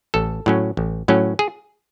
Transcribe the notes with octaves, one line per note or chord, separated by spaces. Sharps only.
A1 A4
A2 F#3 C#4
A1
A2 F#3 C#4
G#4